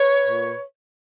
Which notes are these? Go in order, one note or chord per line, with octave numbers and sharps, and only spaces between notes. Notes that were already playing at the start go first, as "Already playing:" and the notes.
Already playing: B4 C#5
A#2